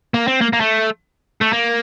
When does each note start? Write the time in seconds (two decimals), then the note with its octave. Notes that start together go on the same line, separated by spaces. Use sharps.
0.14 A#3
0.28 C4
0.41 A#3
0.53 A#3
0.61 A3
1.41 A3
1.53 A#3